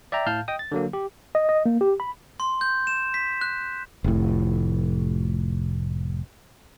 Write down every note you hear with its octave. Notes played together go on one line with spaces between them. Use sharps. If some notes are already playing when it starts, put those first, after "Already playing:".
D5 E5 G5 A#5
A2 F5 A5 F6 G6
D#5 G5 D#6
A6
D3 F#3 A#3
G4
D#5
D#5
A#3
G4
B5
C6
G6
E7
B6
F#6
F1 A2